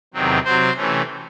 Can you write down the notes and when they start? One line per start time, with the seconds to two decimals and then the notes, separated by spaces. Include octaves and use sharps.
0.14 E2 C3 D#3 F#3 C4
0.45 C3 F#3 C4 C5
0.76 C3 E3 A3 C#4